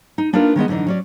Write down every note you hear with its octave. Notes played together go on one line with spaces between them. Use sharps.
D#4
A#3 D4 D#4 F4 A#4 B4
D#3 G#3 B3 D#5
F#2 D3 E3 D4 D#4
F#3 C#4 D5